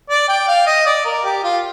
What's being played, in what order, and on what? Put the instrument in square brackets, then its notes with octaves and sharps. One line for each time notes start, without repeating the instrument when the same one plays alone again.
[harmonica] D5
G5
F5
D#5
D5
A#4
G4
F4